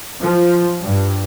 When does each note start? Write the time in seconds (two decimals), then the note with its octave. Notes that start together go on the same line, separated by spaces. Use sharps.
0.21 F3
0.82 G2